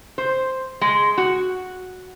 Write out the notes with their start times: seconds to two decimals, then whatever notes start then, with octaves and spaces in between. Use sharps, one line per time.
0.18 C5
0.81 G#3
1.18 F#4